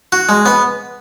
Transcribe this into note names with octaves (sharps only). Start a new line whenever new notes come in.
F#4
G#3
B3